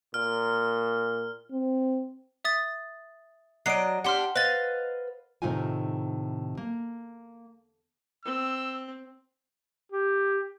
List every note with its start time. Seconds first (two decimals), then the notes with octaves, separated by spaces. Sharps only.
0.14 A#2 F6
1.52 C4
2.45 E5 D#6 A6
3.66 F#3 D4 D#5 C7 D7
4.05 D4 G4 F#5 C6 F6
4.36 B4 C5 D#5 F5 A6
5.42 A2 C3 D#3 D#4 F4 G#5
6.58 A#3
8.25 C4 E6
9.92 G4